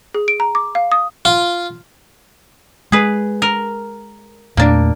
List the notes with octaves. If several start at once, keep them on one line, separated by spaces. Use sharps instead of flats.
G#4
D7
A#5
D6
F5
D#6
F4
G#3 G#4 B4
A#4
E2 A#2 A3 A#3 D4